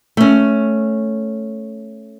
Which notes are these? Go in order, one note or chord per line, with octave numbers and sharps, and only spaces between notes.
A3 C#4